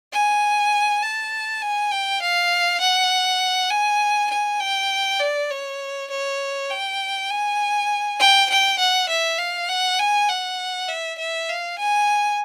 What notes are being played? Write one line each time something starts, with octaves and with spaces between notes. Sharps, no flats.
G#5
A5
G#5
G5
F5
F#5
G#5
G#5
G5
D5
C#5
C#5
G5
G#5
G5
G5
F#5
E5
F5
F#5
G#5
F#5
E5
E5
F5
G#5